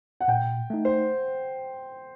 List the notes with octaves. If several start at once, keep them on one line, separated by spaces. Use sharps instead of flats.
F#5
A#2 G5
A3 D#4
C5